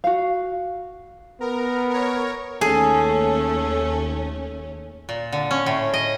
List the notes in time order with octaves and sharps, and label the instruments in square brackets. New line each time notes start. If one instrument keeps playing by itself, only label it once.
[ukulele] F#4 F5
[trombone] B3 [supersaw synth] A#4
[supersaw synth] A#4 C#5
[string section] D#2 A3 C#4 [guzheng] G#4 [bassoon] A4
[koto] A#2
D3
C#4
A2
D#5